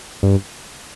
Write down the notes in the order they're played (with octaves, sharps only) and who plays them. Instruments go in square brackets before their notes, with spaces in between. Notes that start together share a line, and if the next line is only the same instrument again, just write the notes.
[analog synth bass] G2